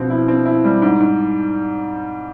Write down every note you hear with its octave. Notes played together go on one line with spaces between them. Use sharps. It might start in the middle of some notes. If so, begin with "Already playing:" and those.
Already playing: B2 F3 C4
E4
C4
E4
G3
G#2
G#2